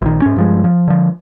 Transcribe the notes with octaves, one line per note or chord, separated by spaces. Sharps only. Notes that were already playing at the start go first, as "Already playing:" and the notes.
A#1 D#3
G#2 C#4
G2 F3 G#3
F3
D3 F3